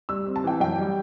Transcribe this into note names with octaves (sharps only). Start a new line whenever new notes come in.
G3 E6
C4
A5
E3 G5
F#2 G5
G3